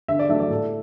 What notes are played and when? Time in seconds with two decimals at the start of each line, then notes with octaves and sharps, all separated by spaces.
0.08 D3 E5
0.19 D5
0.29 F#3 A3 D4 E5
0.40 D5
0.50 A2 A4